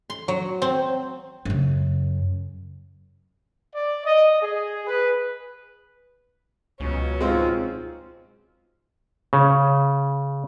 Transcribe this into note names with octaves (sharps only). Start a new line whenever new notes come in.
C6
F#3
C4
F#2 C#3
D5
D#5
G#4
B4
C#2 B2 F#3 C#4
G#2 G#3 C4 F4
C#3